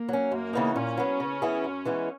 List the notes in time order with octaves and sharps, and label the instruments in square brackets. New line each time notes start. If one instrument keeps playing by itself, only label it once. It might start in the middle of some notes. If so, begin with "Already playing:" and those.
Already playing: [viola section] A#3
[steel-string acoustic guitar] F#3 C#4
[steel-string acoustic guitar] F#2 [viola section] A#3
[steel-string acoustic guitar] C#3 E3 B3 D#4
[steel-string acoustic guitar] A#2 [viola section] C#4
[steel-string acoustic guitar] F#3 B3
C#3
E3 B3 E4 G#4
F#2
E3 G#3 B3